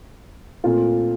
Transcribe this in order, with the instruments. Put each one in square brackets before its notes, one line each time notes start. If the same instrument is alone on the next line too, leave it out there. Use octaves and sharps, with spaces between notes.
[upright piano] A#2 A3 C4 F4